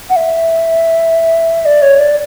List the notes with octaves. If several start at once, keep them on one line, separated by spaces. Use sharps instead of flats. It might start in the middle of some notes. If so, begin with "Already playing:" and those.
F#5
E5
D5
C#5
D5